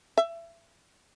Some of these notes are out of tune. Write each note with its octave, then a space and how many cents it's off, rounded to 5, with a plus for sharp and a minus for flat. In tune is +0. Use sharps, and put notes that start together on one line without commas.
E5 +30